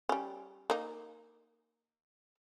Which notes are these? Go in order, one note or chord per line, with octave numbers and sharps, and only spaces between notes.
G3 C#4
A#3 D#4